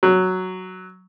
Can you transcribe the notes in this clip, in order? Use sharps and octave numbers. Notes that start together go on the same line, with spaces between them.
F#3